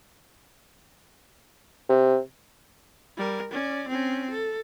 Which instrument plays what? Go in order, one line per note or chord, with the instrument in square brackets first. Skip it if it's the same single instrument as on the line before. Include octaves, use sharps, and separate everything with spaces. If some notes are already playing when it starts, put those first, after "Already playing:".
[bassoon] C3
[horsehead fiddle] G3 A#4
C#4 D5
C4 C#4
A4